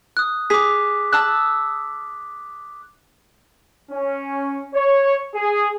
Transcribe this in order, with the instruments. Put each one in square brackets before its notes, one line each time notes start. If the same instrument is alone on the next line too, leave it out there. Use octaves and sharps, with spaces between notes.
[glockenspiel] D#6 F#6
[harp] G#4 [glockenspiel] D6 B6
[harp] A5 E6 F#6
[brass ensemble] C#4
C#5
G#4